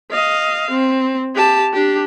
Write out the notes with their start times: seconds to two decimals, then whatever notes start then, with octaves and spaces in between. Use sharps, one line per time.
0.11 D#5 F5
0.71 C4
1.35 G4 A5
1.73 D4 G4